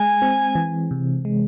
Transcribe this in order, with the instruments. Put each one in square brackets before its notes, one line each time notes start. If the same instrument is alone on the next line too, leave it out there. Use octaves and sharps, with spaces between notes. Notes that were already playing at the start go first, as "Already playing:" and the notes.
Already playing: [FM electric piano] G#3 [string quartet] G#5
[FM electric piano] C4
E3
C3
G#3